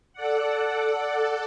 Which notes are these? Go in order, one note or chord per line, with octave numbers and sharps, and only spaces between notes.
A4 D5 F#5